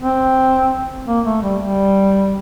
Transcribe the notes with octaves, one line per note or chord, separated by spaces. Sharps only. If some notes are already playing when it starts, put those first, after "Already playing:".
C4
A#3
A3
G3
G3